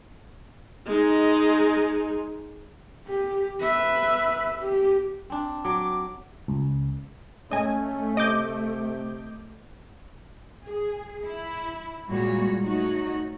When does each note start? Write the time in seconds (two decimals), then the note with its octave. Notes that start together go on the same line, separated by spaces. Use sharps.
0.87 G#3 D#4
3.07 G4
3.60 B4 E5
4.59 G4
5.30 C4 D4
5.65 F#3 D6
6.48 C#2
7.51 A3 C#4 D#5 G#5
8.17 C3 D#5 D6 G6
10.65 G#4
11.25 E4
12.09 A#2 G3 G#3 F#4 C#5
12.63 A3 D#4 F#4 C#5